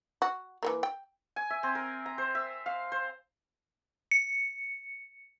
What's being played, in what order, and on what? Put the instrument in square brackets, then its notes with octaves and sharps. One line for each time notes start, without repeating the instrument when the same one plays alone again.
[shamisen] F#4
E3 A3 A#3
G5
[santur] G#5
E5
C4
A#4
A#5
C5
E5
F5
C5
[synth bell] C#7